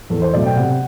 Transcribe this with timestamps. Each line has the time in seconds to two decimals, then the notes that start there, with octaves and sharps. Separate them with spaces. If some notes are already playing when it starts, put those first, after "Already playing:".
0.10 E2 A4
0.22 C5
0.33 B2 F#3 A3 D5
0.45 G5
0.56 C3 F#5